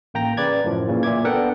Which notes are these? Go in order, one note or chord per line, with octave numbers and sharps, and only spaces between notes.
A1 A#3 G5 A#5 A#6
C#3 B4 D5 G#6 A6
F#2 A2 F3
A#2 C#3 E3
A#2 E5 D6 G#6
B3 D4 A4 A#4 F#5 G5